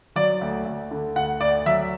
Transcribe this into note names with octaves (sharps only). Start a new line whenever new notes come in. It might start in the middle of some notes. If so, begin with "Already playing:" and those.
F#3 D5
D2
D2
D3
D2 F#5
D2 D5
F#3 E5